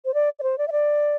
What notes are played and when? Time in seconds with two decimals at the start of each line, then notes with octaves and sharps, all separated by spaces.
0.05 C5
0.14 D5
0.39 D5
0.43 C5
0.58 D5
0.68 E5
0.72 D5